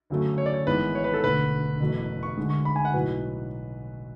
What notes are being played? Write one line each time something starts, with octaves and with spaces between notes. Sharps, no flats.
D2 C#3 F#3 A3
C#5
D5
C#5
G#1 G#2 E3 G#3 B3 B4
C#5
B4
A4
E1 D2 D3 A3 B4
F#1 E2 B2 F#3 A3
C#6
D2 D3 G#3
C#6
B5
G#5
F#5
B1 A2 F#3 B4